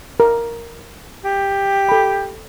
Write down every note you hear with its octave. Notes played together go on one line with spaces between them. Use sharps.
A#4
G4
A4 B5